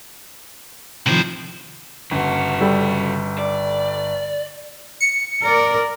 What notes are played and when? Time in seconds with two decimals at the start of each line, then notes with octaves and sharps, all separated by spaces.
1.06 A2 C3 D#3 F3 C5
2.11 G1 C#3 F#4
2.60 G3 A4
3.38 D5
5.01 C#7
5.41 A#4 D5